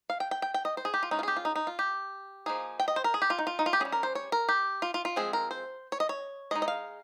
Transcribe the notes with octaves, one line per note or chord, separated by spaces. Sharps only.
F5
G5
G5
G5
G5
D#5
C5
G#4
G4
F4
G#3 C#4 D#4
F4
G#4
G4
F4
D#4
D#4
F4
G4
F3 A#3 D#4 G#4
G5
D#5
C5
A#4
G#4
G4
F4
D#4
F4
D#4
F4
G4
G3 C#4 G#4
A#4
C5
C#5
A#4
G4
F4
F4
F4
F3 G#3 C4 G#4
A#4
C5
C#5
D#5
C#5
G#3 D#4 D#5
D#5
F5